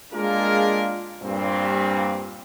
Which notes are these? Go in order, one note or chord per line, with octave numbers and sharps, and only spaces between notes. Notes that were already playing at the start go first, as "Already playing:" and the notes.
G#3 A#3 D4 F4 G#4 A#4
G2 A#2 C4